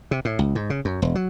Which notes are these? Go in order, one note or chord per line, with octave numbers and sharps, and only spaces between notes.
C3
A2
C#2
G#2
C#3
F#2
E1
F#3